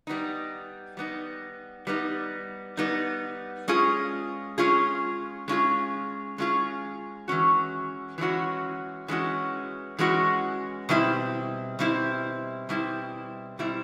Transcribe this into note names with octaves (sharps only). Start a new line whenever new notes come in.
G3 B3 D#4
G3 B3 D#4
G3 B3 D#4
G3 B3 D#4
G#3 C#4 F4 G#4
G#3 C#4 F4 G#4
G#3 C#4 F4 G#4
G#3 C#4 F4 G#4
E3 G#3 C#4 F#4
E3 G#3 C#4 F#4
E3 G#3 C#4 F#4
E3 G#3 C#4 F#4
B2 G3 C4 E4
B2 G3 C4 E4
B2 G3 C4 E4
B2 G3 C4 E4